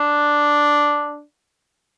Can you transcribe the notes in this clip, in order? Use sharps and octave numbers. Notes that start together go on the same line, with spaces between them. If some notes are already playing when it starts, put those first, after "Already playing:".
Already playing: D4